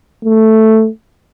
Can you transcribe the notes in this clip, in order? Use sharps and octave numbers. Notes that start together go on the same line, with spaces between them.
A3